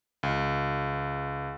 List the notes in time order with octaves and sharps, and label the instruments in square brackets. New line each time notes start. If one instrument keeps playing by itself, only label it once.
[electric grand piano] C#2